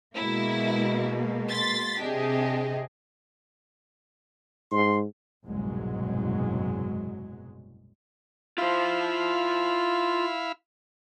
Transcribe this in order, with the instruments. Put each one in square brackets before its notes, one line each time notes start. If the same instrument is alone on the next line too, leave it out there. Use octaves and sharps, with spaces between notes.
[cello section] B2 G#3 A#3 [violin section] E4
[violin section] C6 A6 B6
[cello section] C3 G#4 D#5 [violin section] D4 G4
[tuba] G#2 [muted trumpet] C6
[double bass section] F#1 C2 G#2 B2 F#3 G#3
[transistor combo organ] E4 F5 B5 [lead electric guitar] F4 C5